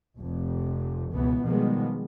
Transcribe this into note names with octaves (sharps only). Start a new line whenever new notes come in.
F1 F2 C3
C#2 B2 E3 B3
B2 D#3 F3 G3 G#3 B3